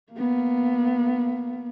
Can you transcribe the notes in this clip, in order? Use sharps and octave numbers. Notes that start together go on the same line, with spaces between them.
A#3 B3